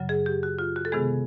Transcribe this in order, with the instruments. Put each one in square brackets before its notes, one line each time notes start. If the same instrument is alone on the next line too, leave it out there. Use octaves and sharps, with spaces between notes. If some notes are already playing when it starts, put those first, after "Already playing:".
Already playing: [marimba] F#2 C#3 F#3
G#4
G4
F#4
F4
F#4
A4
C3 D#3 G#3 B3 G#4